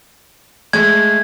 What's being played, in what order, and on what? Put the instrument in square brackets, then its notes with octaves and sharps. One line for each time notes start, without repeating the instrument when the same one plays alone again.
[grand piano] G#3 A3 [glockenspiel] G#6